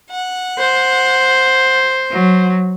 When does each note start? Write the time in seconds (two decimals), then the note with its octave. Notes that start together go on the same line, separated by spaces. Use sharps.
0.11 F#5
0.58 C5
2.12 F#3